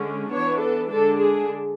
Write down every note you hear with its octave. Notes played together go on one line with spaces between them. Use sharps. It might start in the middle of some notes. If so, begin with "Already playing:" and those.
Already playing: D3 G#3 C#4
E3 B3 D4 C#5
A4
D3 G#3 D4 A4
G#4